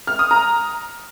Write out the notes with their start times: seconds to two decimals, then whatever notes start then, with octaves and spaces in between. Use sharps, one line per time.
0.07 F6
0.19 D#6
0.31 A#5